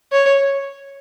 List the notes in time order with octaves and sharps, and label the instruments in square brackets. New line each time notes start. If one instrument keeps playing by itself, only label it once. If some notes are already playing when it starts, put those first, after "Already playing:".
[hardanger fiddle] C#5